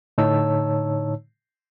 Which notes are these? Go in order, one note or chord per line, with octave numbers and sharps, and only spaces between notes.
A2 D3 D#4 C#5 A5 E6